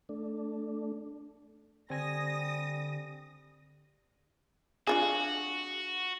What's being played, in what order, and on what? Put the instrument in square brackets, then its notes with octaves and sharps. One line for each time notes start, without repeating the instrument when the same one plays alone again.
[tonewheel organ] A3 D4
[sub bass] D3 [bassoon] G3 [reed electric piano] C4 G#5 [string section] D#6 A#6
[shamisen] D4 F4 G#4 [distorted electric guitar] F#4